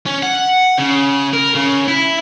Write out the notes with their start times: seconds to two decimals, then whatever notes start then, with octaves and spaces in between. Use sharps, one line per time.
0.06 C#4
0.23 F#5
0.78 C#3
1.33 A#4
1.55 C#3
1.88 E4